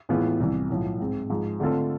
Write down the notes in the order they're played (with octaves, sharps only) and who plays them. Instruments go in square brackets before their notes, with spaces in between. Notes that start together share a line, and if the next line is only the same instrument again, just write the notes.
[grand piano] A2 E3 G#3 B3 F4
C2 C3 E3
B1 A2 F3
G#2 G#3 C4
G#2 F3 G#3
D3 A3 C4 F4 A4